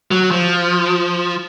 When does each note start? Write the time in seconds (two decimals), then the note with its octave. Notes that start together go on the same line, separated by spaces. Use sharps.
0.11 F#3
0.31 F3